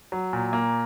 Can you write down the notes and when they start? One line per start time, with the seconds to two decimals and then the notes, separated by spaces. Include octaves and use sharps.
0.12 F#3
0.33 A#2
0.53 A#3